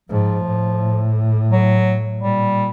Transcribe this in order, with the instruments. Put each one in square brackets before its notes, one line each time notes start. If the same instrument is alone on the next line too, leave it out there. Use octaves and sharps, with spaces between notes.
[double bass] G#2 [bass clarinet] F3
[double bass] A2
[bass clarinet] F#3
[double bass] A#2 [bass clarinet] G3